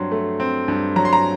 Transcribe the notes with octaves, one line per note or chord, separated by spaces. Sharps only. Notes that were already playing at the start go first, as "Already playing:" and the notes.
Already playing: G2 F#3 C4 C6
A3
C4
G2
F#3 A#5
C6
A#5